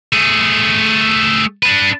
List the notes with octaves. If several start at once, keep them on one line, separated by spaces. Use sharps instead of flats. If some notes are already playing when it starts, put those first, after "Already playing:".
A3 G#4
D4 B4